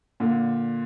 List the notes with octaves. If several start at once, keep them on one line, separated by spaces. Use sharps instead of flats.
A#2 D3